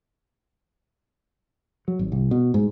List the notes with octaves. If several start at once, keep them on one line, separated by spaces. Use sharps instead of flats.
F#3
G#1
C2
B2
G#2